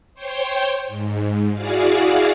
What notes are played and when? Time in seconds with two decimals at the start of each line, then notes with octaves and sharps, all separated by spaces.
0.14 C5 C#5 G5 C6
0.87 G#2
1.53 E4 F#4 G#4 D5 F5